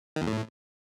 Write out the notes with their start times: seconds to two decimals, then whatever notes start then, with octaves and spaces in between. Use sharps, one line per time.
0.16 D#3
0.22 E2
0.27 A2